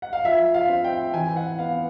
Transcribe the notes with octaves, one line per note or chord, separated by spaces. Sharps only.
F#5
F5
F3 E5
F5
C4
G5
E3 G#5
F#5
B3 F5